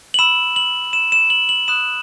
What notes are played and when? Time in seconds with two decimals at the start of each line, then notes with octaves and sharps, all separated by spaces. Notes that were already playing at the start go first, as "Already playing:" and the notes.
0.14 F#7
0.19 B5 E6 E7
0.56 F#7
0.93 E7
1.12 E7
1.30 F#7
1.49 F#7
1.68 B5 D#6 F#6 E7